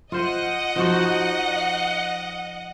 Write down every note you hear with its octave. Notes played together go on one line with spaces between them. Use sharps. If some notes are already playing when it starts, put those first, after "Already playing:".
F4 C5 D#5 F#5
F3 D#4 F#4